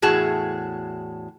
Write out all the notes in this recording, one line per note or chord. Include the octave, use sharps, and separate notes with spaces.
E2 A2 F#4 G#4 A5